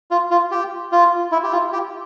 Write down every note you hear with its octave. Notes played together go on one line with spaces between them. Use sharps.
F4
F4
G4
F4
E4
G4
F4
G4